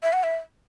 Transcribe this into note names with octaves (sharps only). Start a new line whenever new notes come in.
E5
F#5
E5